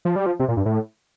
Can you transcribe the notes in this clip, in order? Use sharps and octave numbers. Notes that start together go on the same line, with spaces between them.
F3
G3
F3
C3
A#2
G2
A2